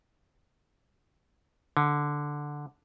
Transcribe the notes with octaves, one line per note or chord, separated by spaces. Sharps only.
D3